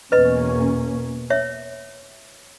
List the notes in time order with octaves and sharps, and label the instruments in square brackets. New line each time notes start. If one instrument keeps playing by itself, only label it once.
[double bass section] E2 B2 A#3 C#4 [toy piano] B4 D#5
[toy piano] C#5 E5